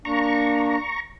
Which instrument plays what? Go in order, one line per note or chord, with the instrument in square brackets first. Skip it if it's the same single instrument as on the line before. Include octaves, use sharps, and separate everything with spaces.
[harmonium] A#3 D4 [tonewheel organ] A#5 C#6